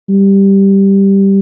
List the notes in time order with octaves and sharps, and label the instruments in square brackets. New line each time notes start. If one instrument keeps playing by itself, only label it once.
[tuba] G3